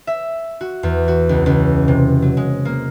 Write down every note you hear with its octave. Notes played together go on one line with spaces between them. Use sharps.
E5
F#4
E2
F#4
C#2
C#2
C3
F#3
G#3
A#3